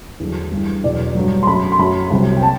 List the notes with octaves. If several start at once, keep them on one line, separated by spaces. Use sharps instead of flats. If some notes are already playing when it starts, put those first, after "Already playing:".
E2 D3 F#3
G2 E3
E2 B2 F#3 D5
G2 F#3
C6
F#2 F#3 B5
C6
F#2 F#3 B5
C2 C3 F#3
G5
A5